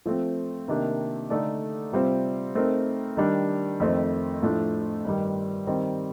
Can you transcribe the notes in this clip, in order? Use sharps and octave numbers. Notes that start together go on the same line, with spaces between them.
F3 A3 C4
C3 D#3 A#3 D4 G4
D3 A3 D#4 A4 D5
C3 G3 C4 F4 C5
A3 C4 D#4 A#4
D#3 G3 D4
F2 D#3 A3 C4
A2 F3 A3 D4
G2 D#3 G3
D#3 G3 C4